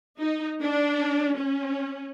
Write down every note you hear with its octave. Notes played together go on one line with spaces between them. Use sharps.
D#4
D4
C#4